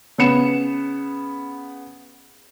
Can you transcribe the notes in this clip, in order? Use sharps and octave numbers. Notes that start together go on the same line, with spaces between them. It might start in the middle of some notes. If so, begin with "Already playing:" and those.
C#3 B3 C#7 E7